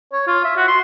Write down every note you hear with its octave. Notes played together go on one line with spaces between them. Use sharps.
C#5
F4
E5
F#4
C6